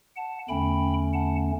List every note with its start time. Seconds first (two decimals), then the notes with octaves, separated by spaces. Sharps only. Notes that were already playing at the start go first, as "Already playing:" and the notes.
0.16 F#5 A5
0.48 E2 D3 A3 C#4 G5 B5
1.13 F#5 A5